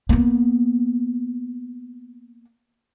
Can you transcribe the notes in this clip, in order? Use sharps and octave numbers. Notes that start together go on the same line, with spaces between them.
A#3 B3